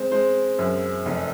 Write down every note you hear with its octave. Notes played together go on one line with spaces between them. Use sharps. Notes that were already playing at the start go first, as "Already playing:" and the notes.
Already playing: G#3 C4 C5
G#3 C5
F#2
F1